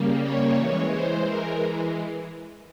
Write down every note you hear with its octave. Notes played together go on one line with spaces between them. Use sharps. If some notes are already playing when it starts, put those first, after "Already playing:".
Already playing: C#3 G3 A#3
C#5
E3 G#3
C5
A#4